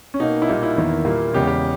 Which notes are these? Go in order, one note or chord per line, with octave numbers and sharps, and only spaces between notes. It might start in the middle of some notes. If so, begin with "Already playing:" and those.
C#4
B2 A#3 D#4
E4
A#2 G3 A#3 D#4
E4
E2 D#3 A#3
A#2 G3 A#3
E2 C#3 G#3 G4
G4